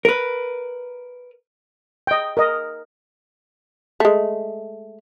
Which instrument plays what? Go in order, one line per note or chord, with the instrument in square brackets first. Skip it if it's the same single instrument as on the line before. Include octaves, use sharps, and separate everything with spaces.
[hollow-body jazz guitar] A#4 B4
[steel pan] D#5 G5
A#4 D#5
[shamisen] G#3 A3